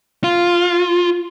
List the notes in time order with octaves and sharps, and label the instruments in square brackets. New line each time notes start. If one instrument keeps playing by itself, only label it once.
[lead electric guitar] F4